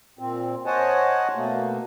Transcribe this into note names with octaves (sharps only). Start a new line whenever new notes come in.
A#2 C4
C5 C#5 D#5 F#5 G#5 A5
B2 A3 A#3